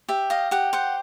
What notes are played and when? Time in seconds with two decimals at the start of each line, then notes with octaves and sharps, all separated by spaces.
0.08 G4 E5
0.30 D#5 F5
0.51 G4 F#5
0.73 C5 F#5